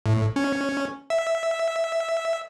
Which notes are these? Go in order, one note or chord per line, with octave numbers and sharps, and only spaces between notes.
A2
C#4
E5